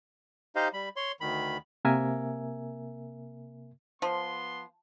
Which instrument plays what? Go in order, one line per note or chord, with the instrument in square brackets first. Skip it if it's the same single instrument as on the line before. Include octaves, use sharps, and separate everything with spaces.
[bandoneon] D#4 G4 C5 D#5 F5
G3 B5
C#5 C6
D2 D#3 B5
[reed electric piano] C3 A#3 A#4 E5 G#5
[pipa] F3 [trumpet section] B3 C6 [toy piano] A5